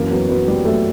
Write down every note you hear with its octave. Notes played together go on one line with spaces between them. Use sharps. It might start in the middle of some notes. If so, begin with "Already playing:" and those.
Already playing: F#2 E3 A#3
F#3 B3
F#3 B3
G3 A#3
F#3 A3